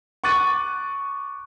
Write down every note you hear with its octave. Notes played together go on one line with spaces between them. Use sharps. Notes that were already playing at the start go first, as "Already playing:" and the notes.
C#6 D6 F#6 A6 D#7